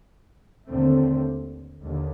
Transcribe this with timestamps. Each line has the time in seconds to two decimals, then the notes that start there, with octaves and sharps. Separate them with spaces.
0.69 D#2 D3 A3 C4
1.83 D#2 D3